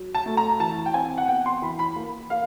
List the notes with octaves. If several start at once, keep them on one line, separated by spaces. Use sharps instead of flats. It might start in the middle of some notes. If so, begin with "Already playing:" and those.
Already playing: F#3
A5
A3
A#5
E3 A5
G5
C4 G#5
F#5
B3 G5
C6
E3 B5
B5
A#3
A#3 F5